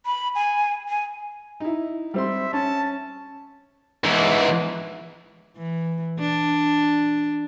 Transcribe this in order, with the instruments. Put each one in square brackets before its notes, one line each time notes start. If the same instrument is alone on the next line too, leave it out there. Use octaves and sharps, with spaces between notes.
[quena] B5
G#5
G#5
[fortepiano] D#4 E4
[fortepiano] G3 C4 C6 [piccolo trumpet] E5
[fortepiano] C#4 [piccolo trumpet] A5
[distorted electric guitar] G#2 E3
[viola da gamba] E3
D4